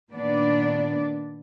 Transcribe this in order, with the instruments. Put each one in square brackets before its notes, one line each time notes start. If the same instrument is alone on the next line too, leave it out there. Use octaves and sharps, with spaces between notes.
[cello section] A#2 D#3 B3 D4 D5